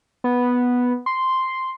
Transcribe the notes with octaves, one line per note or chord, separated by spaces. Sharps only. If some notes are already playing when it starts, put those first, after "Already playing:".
B3
C6